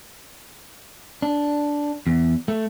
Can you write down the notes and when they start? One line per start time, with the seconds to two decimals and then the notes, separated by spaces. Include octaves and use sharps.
1.22 D4
2.07 E2
2.48 A3